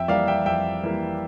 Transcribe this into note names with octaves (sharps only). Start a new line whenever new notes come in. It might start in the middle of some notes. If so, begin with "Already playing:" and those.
Already playing: F2 E5 G5
E3 G3 A#3 D5 F5
E5 G5
F2 E5 G5
E3 G3 A#3